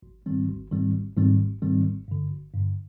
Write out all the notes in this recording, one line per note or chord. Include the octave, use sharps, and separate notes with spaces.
G#1
G#2 D#3 G3 C4
G#1
G#2 D#3 G3 C4
G#1
G#2 D#3 G3 C4
G#1
G#2 D#3 G3 C4
G#1
G2 D3
G#1
G2 D3